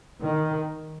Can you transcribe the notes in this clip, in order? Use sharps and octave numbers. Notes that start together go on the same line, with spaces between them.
D#3